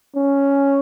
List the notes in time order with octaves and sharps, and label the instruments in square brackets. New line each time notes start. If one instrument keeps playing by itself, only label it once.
[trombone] C#4